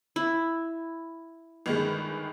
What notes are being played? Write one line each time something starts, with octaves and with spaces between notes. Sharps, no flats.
E4
G1 D#3 G#3